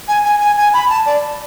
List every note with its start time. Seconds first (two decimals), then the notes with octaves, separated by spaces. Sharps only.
0.08 G#5
0.24 G#5
0.40 G#5
0.57 G#5
0.74 B5
0.90 A5
1.06 D5